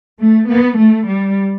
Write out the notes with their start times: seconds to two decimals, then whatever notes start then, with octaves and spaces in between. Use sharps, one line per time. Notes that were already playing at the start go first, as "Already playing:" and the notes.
0.19 A3
0.48 B3
0.78 A3
1.08 G3